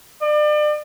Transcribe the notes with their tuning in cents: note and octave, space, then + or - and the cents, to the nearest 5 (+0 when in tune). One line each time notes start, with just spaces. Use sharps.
D5 +35